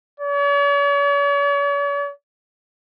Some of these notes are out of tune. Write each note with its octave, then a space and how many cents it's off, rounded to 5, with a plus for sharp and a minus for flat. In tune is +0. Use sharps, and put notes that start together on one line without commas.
C#5 +45